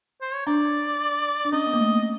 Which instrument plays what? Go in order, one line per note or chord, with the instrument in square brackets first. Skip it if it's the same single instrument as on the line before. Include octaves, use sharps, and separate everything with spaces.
[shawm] C5
C#5
[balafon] D4 [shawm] D5
[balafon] D4
[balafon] C#4 [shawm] D#5
[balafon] B3
A#3
A3
B3